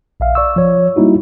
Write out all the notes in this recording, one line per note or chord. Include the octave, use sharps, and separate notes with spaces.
A#1 E5 F5
D5 C#6 E6
F3 C#5
G3 A#3 D#4 E4 F#4